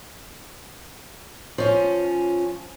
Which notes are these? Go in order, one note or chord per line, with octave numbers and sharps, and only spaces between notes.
F3 C#4